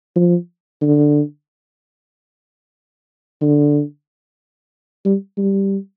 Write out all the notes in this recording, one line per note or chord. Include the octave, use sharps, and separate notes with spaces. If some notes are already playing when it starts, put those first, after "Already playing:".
F3
D3
D3
G3
G3